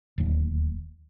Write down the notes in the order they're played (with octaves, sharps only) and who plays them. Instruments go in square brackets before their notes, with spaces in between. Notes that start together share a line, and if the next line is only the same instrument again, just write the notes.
[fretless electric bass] D1 D#2